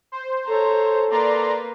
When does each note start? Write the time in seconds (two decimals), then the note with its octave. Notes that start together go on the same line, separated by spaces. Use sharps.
0.12 C5
0.47 A4 C#5 A#5
1.11 A#3 B4 D5 A#5 C6